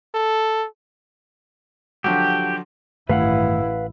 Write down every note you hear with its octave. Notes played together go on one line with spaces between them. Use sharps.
A4
D3 F3 F#3 G4
A1 G2 D#3 A3 E4 B4 F5 F#5